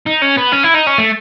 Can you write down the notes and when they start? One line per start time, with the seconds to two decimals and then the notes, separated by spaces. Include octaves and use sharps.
0.06 D#4
0.22 C#4
0.38 B3
0.52 C#4
0.64 E4
0.75 D#4
0.87 C#4
0.98 A3